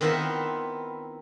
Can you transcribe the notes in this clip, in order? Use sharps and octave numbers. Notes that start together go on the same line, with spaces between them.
D#3 B3 C4 E4 F4 E5